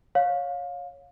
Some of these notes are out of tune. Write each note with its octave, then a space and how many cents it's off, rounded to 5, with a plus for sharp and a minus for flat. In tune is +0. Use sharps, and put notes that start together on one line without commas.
C#5 +0 F5 +25